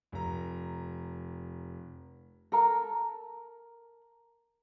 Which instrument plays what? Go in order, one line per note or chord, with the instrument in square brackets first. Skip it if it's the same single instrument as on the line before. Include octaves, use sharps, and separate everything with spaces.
[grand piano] F1 A#5
[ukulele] A4 A#4 A#5